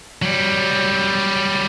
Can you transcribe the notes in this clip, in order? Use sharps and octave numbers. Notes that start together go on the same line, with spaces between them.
F#3 G3